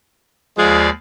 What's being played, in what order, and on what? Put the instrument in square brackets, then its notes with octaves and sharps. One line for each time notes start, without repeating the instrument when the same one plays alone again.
[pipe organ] D#2 D5 F5 [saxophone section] F3 G#3